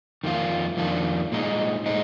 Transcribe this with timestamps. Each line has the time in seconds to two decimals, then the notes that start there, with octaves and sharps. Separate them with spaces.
0.23 F2 D#3 A#3 D4 F4
0.77 F2 D#3 A#3 D4 F4
1.32 A#2 G#3 D#4
1.86 A#2 G#3 D#4